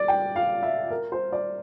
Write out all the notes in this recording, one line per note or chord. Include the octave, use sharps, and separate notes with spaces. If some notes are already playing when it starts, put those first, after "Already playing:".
Already playing: D5
G5
F5
E5
A#4
C5
D5